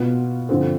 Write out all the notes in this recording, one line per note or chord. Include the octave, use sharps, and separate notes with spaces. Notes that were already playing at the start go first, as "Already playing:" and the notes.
Already playing: B2 B3 F4
G2 D3 F3 C4